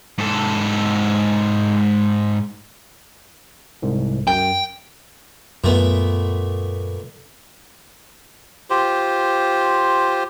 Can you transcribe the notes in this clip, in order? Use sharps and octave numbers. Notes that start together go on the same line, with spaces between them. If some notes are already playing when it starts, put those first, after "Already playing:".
G#2 A4
C2 G#2
F#2 G5
F#2 A#2 A3 B3
F4 G4 C5